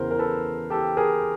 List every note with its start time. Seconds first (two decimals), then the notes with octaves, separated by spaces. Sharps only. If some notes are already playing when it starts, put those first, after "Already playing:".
Already playing: E2 C#3 E3 A#4 C5
0.11 A#4
0.19 A4 B4
0.70 G4 A4
0.97 G#4 A#4